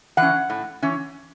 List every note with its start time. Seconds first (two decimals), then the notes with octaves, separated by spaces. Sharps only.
0.17 E3 C#4 F#5
0.50 A2
0.82 E3 C#4